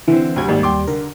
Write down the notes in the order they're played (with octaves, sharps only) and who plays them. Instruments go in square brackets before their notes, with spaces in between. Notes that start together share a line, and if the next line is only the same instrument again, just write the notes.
[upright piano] D3 C4 [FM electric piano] E3
[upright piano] D2 F#3 G3 [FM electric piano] G5 G#6
[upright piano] G#1 [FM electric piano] D#2 G3
[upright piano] G5 C6 D6
[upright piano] D3 [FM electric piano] A#4